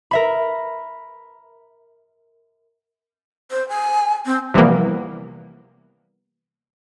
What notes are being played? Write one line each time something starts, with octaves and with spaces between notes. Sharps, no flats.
A#4 E5 B5
C5
G#5
C4
C3 E3 F3 G3 A#3 B3